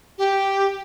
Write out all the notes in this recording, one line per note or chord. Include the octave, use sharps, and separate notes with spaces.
G4